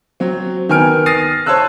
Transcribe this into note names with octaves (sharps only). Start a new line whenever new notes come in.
F#3 C4
D#3 B3 G#5 F6 D7
D#6 F6 A6 A#6 C7 D#7
C5 C#5 A5 E6 F#6